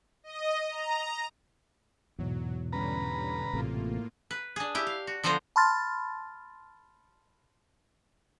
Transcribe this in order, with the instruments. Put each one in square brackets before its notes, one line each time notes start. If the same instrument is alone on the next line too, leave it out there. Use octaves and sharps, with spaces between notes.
[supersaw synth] D#5
A#5
[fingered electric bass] E2 [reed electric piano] G#2 B2 [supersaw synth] F#3
[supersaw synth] D3 G3 C#4 [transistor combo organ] B4 A#5
[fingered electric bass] A1 C3 A3 [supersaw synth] A2 A#3 F4
[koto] B4
D4 G#4
E4 G4
F5
F#4
D3 F3 B3 D4 C5 A#5
[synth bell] A5 B5 C6 F6 A6